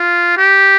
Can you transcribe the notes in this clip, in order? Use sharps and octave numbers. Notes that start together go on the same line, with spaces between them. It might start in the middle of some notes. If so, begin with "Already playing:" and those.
Already playing: F4
G4